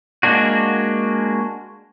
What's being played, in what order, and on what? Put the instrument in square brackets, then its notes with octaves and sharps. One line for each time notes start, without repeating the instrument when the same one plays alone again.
[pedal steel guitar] G#3 A#3 D4 F#4